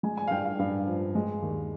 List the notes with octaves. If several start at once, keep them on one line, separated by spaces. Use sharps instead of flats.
G#3 G#5
G#5
F5
G2 G5
F5
G2 F5
F3
G#3
D#2